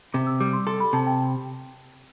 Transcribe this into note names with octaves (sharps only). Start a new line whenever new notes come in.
C3 D6
E6
G3 D6
C6
A4 C6
B5
C3 A5
G5